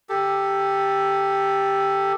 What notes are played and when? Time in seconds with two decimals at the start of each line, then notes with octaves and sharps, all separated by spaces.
0.09 G4 A4